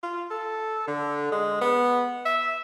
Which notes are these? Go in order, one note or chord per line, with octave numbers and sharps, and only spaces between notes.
F4
A4
D3
G#3
B3
E5